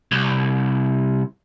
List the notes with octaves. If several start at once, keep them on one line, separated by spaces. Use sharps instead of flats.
C2